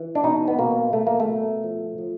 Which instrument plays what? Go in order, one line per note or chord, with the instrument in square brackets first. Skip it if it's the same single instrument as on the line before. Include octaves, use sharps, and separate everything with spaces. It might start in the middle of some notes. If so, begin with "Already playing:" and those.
Already playing: [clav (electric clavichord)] E3
D4
B2 D#4
B3
B2 A#3
B2 A3
A#3
A3
B2
F3
F3